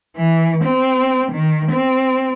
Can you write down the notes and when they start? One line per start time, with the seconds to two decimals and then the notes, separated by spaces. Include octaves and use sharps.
0.16 E3
0.64 C4
1.32 D#3
1.72 C4